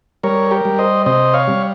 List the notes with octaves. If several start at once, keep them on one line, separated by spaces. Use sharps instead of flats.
G3 A#4 C#5
G4 A#4
G3
C5 D#5
C3 C5 D#5
C#5 F5
G3